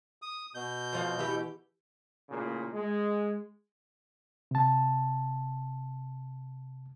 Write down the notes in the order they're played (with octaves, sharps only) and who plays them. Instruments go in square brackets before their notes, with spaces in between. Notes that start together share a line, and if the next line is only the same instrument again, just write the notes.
[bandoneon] D#6
B2 G6
[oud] F2 F3 F5
E3 G4
[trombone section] A1 A#2 C#3
G#3
[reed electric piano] C3 A5